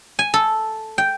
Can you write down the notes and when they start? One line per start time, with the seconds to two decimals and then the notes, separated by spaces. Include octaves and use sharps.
0.19 G#5
0.34 A4
0.98 G5